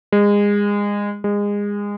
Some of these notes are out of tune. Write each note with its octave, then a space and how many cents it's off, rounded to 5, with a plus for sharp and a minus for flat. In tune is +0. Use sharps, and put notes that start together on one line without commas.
G#3 -25
G#3 -25